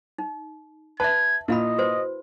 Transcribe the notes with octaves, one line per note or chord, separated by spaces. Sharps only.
D#4
B4 E5 A5 G#6
A#2 E4 D#5 F5 B5
F#4 B4 C5